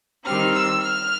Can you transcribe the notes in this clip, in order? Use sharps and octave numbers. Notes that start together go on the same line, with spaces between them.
D#3 G3 C4 F6
E6
F6